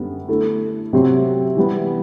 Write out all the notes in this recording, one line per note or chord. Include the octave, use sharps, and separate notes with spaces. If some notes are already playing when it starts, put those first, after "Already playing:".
Already playing: F#2 D3 G3 B3
D3 A3 E4
C3 F#3 C4 G4
E3 G3 B3